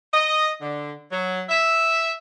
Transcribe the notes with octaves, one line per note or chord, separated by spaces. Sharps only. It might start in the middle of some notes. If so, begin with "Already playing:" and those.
D#5
D3
F#3
E5